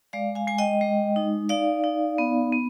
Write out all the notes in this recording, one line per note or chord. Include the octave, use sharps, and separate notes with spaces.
G#3 D5 F5
F5 G#5
G#3 G#5
D#5 G5
G#3
D#4
D#4 D5 F5
D#4
B3
B3